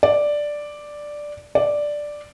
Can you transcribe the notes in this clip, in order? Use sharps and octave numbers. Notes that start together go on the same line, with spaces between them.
D5
D5